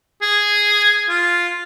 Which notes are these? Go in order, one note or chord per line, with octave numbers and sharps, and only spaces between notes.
G#4
F4